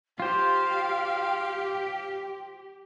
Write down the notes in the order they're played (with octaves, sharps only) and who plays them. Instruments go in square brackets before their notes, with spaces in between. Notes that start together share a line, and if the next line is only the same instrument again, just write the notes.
[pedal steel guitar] F4 C5 [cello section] G4 [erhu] F5 [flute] G5